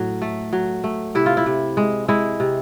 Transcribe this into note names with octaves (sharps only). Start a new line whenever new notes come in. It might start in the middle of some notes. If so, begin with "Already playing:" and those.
Already playing: A2 F#3
A3
F#3
A3
C3 E4
F4
E4
C3
G#3
G#3 E4
C3